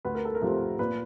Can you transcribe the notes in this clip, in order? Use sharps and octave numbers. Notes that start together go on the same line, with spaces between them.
D2 B4
A#4
A4
A#4
C3 F3 A3 C4
A#2 B4